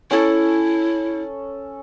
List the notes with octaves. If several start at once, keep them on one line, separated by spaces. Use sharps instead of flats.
C#4 E4 A4